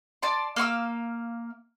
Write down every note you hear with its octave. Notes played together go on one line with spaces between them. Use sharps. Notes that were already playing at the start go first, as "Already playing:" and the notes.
D5 A5 C6
A#3 F5 C#6 E6